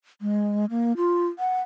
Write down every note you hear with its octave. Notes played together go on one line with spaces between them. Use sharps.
G#3
A#3
F4
F#5